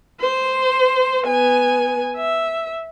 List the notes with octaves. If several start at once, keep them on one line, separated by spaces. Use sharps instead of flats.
C5
B3 G#5
E5